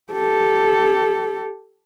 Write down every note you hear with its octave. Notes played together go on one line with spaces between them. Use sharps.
G4 A4